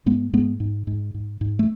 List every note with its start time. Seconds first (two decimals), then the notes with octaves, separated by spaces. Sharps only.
0.06 G#2 G#3 B3
0.33 G#2 G#3 B3
0.60 G#2
0.87 G#2
1.14 G#2
1.41 G#2
1.59 A3